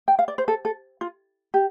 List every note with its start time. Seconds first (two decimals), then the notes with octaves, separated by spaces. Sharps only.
0.08 G5
0.19 F5
0.28 D5
0.38 C5
0.48 A4
0.65 A4
1.01 F4
1.54 G4